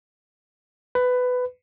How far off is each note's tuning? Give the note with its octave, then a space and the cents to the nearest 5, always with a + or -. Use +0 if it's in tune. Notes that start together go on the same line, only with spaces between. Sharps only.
B4 +15